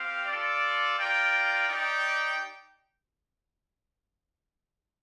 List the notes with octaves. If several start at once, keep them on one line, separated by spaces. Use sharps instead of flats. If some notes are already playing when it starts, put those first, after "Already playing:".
Already playing: C4 G4 F5
F4 A4 D5
F4 A#4 D5 G5
D#4 G4 D5 G5